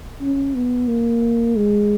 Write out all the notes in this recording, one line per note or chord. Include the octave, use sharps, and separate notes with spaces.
C#4
B3
A#3
G#3